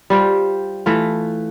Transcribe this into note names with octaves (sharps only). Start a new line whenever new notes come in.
G3 F4 C5
E3 A3 F4